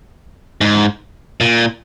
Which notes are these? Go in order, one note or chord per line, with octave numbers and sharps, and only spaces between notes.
G#2
A#2